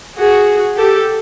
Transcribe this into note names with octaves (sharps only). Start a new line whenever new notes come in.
F#4 G#4
G4 A4